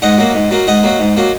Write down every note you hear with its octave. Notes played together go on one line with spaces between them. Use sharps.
G#2 D#5 F#5
F#3 A#3
G#2
F#3 A#3
G#2 D#5 F#5
F#3 A#3
G#2
F#3 A#3